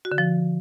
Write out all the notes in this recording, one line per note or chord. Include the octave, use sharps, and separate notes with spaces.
F#4
D3
F3